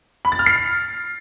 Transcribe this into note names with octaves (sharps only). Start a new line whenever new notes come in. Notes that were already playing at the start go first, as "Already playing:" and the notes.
B5
A6
F6
C7